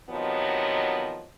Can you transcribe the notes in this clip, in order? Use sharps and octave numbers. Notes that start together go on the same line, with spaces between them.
C3 D#3 F3 F#3 B3 D#5